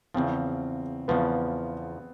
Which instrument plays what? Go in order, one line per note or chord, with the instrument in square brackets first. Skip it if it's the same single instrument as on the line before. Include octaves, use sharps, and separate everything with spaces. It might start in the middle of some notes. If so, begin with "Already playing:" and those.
[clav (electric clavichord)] E2 C#3 F3 [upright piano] C4
[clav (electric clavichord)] E2 C#3 F3 [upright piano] B3